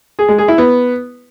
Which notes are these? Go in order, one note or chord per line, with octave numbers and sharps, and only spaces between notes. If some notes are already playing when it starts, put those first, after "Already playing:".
G#4
G#3
G#4
E4
B3